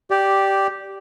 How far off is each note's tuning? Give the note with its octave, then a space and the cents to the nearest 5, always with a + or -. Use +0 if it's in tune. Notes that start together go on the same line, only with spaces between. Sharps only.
G4 -5 D5 +0